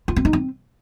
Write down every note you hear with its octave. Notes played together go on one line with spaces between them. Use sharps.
F4
C4
D#4
C4